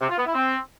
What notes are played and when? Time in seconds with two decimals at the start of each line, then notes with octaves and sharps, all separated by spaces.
0.01 C3
0.09 F4
0.18 B3
0.26 E4
0.35 C4